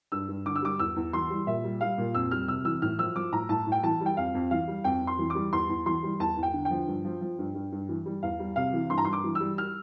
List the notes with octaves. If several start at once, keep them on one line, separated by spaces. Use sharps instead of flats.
G2 E6
G2
D3 D6
E6
G3 D6
E2 E6
E2
E3 C6
G3
A#2 E5
G3
G3 F5
A#2
F2 E6
G3 F6
C3 E6
E3 E6
A2 F6
F3 E6
F3 D6
A2 A#5
A2 A5
A2
G5
E3 A5
G3
G5
F2 F5
F2
E3 F5
G3
F2 G5
F2
C6
E3
D6
G3
E2 C6
E2
E3 C6
G3
E2 A5
E2
G5
D3
G5
F3
G2
F3
F3
G2
G2
G2
E3
G3
E2 F5
G3
C3 F5
E3
G2 C6
A#5
G2 C6
D6
E3
E6
G3
F6